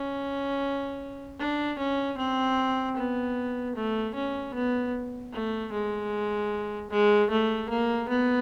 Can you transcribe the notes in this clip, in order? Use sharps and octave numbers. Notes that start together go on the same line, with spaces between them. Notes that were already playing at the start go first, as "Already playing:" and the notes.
Already playing: C#4
D4
C#4
C4
B3
A3
C#4
B3
A3
G#3
G#3
A3
A#3
B3